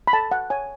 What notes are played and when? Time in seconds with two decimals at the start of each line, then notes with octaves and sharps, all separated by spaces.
0.07 B5
0.13 A4 A5
0.31 F#5
0.50 C#5 G#5